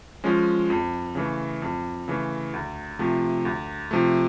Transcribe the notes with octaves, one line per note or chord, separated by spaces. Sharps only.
F3 G#3 C#4
F2
C#3 E3 A3
F2
C#3 E3 A3
D2
C3 F3 A3
D2
C3 F3 A3